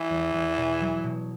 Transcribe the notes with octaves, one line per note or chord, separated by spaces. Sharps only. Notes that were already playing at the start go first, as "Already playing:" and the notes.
Already playing: E3
E2
E2
B2
F#3
B2